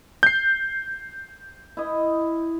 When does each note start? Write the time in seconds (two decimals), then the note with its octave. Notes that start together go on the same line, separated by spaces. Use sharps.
0.23 G6 C7
1.77 E4 D#5